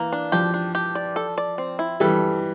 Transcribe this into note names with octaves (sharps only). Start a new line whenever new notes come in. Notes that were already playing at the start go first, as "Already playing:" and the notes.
Already playing: E3 A#3
D4
F3 G4
D4
G4
D5
A4
D5
C4
E4
E3 G3 A4